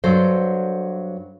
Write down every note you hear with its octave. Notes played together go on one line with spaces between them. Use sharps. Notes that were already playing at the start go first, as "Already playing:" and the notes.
G2 F#3 A4 C5